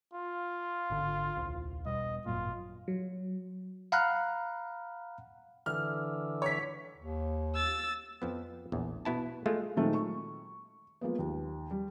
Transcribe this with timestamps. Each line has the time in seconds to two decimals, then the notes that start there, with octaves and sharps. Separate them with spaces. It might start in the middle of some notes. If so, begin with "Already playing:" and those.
0.13 F4
0.90 G#1 D3
1.37 D#1 C2
1.85 E1 B2 G3 D#5
2.26 G#1 F#2 A#2 F4
2.88 F#3
3.92 F5 F#5 A#5 B5 F6 F#6
5.66 D3 E3 F6
6.42 C#5 B6
6.97 D#2
7.54 E6 A6
8.22 F2 F3 B3
8.72 A#1 E2
9.05 B2 B3 E4 A5
9.46 G#3 A3 F4
9.77 A#2 D#3 F#3 G#3 A3 C4
9.94 C#6
11.01 F3 G#3 A#3 B3
11.19 D#2
11.71 G3